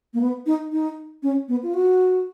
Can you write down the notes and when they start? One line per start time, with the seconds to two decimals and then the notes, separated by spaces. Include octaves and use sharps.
0.14 A#3
0.21 B3
0.46 D#4
0.72 D#4
1.23 C#4
1.48 B3
1.63 F4
1.74 F#4